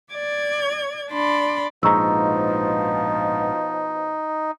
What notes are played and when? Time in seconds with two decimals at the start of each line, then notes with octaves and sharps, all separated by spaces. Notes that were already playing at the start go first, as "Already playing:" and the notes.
0.13 D5 G#6
1.09 D4 D5 B5 C6
1.83 A#1 G#2 B2 F3 D#4 A#5 C#6 E6